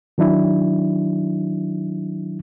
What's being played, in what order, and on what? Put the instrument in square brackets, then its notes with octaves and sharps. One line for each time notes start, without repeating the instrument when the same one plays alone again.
[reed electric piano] D#3 F#3 D4 E4